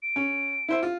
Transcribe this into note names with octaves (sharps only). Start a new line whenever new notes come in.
D7
C#4
E4 C5 E5
F4